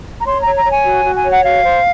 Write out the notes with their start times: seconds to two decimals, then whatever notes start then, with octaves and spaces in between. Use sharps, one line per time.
0.20 A#5
0.25 C#5 C6
0.40 A#5
0.46 C#5
0.56 A#5
0.65 C#5 G#5
0.84 F#4
1.04 F#4
1.15 G#5
1.24 C#5
1.30 F#5
1.43 F#4 F5
1.63 C5